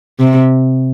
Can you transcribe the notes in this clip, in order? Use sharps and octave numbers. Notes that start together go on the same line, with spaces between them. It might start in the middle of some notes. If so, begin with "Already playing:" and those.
C3